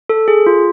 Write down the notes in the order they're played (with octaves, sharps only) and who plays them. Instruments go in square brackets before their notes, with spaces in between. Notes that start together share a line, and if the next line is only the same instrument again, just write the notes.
[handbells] A4
G#4
F4